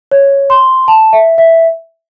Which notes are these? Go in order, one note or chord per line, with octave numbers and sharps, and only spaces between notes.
C#5
C6
A5
E5
E5